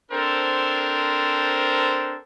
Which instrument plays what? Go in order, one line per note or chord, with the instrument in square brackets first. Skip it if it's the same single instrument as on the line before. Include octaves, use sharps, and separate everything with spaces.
[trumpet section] C4 D4 A4 A#4 C5